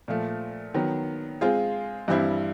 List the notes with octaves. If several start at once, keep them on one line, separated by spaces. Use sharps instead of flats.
A#2 F3 A3
D#3 F#3 B3
G#3 C4 F4 G#4
G2 E3 G3 C4 E4